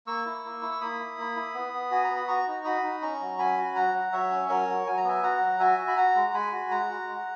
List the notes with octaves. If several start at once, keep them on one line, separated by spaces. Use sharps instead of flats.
A#3 C#6 E6
E4
A#3
E4
C#6
A#3 B5 D#6
E4
A#3
E4
B3
B3
F#4 G#5
A#5
B3
B5
F#4 A#5 C#6
D#4
F#4 B5 D#6
D#4
C#4 A#5 C#6
F#3
C#4 G#5 B5
F#4
F#3 F#5 A#5
F#3
F#3 C#5 E5
C#4
F#3 A#4 C#5
F#3
F#3 G#5
A#5
B3 E5 G#5
F#4 F#5 A#5
F#3
F#4 E5 G#5
F#4
B5
F#4 F#5 A#5
G#3
G#3 G#5 B5
F#4
G#3 F#5 A#5
F#4
G#3